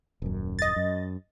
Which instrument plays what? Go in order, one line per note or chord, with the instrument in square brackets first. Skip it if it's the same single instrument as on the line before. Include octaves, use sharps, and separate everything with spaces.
[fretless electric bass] D#1 F#2
[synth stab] D#5 A6
[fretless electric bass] F#2